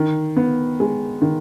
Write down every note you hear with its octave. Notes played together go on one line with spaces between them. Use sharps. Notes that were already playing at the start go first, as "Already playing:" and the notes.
Already playing: D#3
B3
G#3
D#3